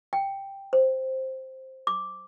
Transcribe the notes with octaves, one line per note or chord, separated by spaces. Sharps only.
G5
C5
D6